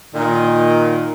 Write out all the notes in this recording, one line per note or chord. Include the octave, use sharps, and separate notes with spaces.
A#2 D#3